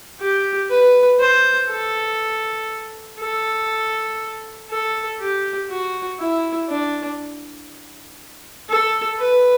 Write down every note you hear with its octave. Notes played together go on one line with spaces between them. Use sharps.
G4
B4
C5
A4
A4
A4
G4
F#4
E4
D4
A4
B4